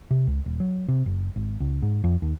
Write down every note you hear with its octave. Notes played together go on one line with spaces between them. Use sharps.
C3
C#2
D#1
F#3
C3
F#1
G#1
C#2
G#2
F2
D#2